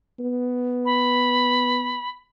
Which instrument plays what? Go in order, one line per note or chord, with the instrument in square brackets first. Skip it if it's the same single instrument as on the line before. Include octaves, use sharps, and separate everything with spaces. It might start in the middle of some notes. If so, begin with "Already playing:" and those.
[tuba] B3
[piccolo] B5